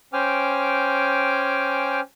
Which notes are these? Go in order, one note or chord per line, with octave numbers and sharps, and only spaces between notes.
C#4 C5 G5 G#5 D6 F6